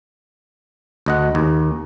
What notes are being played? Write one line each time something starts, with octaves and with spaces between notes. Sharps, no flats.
D2 D#5 F#5
D#2